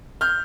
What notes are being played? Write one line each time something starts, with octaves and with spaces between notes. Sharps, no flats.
F6 G6